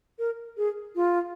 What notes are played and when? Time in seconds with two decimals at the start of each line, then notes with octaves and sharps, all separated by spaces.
0.19 A#4
0.57 G#4
0.95 F4